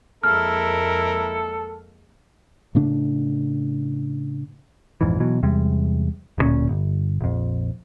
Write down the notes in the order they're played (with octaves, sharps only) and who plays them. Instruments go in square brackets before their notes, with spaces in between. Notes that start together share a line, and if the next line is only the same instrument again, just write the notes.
[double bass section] F2 G#3 A#3 [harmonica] E4 A#4 [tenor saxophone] A4 [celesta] F6
[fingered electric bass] A2 C#3 A3 D4
[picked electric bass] A#1 F2 G#2 E3
B2 E3 F#3
E2 C3 G3 G#3
D1 G2 A#2 C#4
G1
A#1 F2